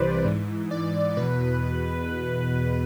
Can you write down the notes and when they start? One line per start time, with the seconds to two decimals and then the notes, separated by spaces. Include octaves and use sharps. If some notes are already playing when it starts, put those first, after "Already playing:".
Already playing: C2 C3 E3 B4 C5 D5
0.25 G#2 E3
0.71 D5
1.17 E2 B2 B4